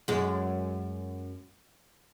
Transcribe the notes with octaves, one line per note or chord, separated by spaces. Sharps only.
F#2 G#3